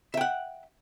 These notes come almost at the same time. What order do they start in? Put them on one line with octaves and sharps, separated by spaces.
E5 G5 F#5